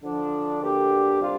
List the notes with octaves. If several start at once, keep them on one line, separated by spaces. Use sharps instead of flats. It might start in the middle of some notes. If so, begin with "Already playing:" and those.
D3 F3 D4
D2 D3 A#3 D4 G4
C3 G3 D4 F4